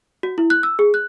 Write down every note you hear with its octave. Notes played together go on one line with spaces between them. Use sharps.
F#4
E4
F#6
E6
G#4
F#6